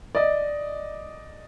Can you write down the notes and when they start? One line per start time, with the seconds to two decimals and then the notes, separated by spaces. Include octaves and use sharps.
0.15 D5 D#5